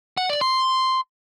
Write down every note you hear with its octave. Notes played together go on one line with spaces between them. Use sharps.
F#5
D5
C6